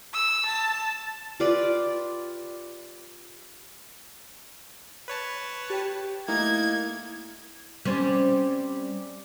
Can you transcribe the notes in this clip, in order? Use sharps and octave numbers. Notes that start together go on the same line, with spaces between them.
E6
A5
F4 G4 B4 D5
B4 C#5 A5
G4 G5
A3 A#3 D#4 E4 G#6
G3 C4 C#4